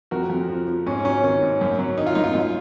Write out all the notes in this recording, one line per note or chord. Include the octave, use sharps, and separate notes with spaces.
F2 F#4 A#4
F2
F3
F3
G#2 C#4
F#3 C#4
D#3 C#4
G#2
F#2
F#3
D#3 D#4
F4
F#2 D#4
F4
F#2 D#4
F4